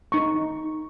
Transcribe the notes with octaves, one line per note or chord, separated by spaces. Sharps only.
D#4 A#5 C#6